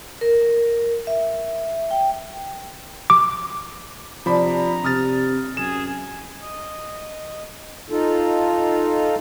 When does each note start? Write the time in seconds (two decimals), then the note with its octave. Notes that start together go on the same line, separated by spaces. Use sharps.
0.21 A#4
1.07 E5
1.91 G5
3.10 D6
4.26 C3 F3 D4 A#5 B5
4.84 C3 D#6 F6 A6
5.57 F#2 G#4 E7
6.41 D#5
7.90 D#4 F4 A4